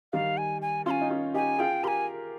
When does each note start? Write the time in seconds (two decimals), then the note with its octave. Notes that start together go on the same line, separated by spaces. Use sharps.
0.13 D#3 G3 F5
0.38 G#5
0.62 G#5
0.86 C#4 F4 C6
0.91 G#5
1.01 D#4
1.10 C#4 F4
1.34 D#4 G4 G#5
1.58 F4 G#4 G5
1.83 G4 A#4 C6
1.88 G#5